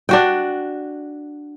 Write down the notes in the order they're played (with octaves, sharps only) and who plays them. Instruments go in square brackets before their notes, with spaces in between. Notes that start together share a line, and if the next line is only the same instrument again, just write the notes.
[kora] D4 F#4 G5